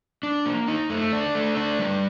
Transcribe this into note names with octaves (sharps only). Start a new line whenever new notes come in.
D4
A#3
D#4
A3
D4
A3
D4
G3